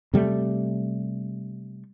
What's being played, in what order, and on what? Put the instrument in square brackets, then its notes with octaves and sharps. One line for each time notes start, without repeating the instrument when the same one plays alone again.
[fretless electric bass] C3 G3 A3